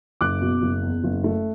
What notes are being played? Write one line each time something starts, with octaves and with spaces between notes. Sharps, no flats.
F#1 D6 F#6
B2
F#1
E2
F#1
A3